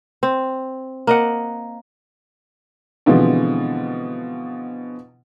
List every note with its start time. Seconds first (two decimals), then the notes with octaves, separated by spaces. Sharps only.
0.23 C4
1.07 A#3 D#5 F#5
3.06 B2 D3 E3 F3 G#3 C4